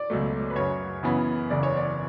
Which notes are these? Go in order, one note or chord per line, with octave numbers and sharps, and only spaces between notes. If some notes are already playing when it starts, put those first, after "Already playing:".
Already playing: D5
C#2 B2 F#3 A3
B4
F#2 C#3 F#3 C#5
F#2 C#3 E3 B3
F#1 E2 C#3 D5
C#5
D5